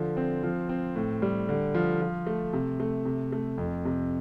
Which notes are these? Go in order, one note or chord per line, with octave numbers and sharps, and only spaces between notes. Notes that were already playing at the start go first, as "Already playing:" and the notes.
Already playing: D3 F3
C4
F3
C4
A2
G3
D3
F3
F3
A3
C3
A3
C3
A3
F2
C3